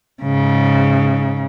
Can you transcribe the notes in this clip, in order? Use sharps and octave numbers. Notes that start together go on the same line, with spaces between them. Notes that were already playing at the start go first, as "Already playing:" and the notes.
G#2 C#3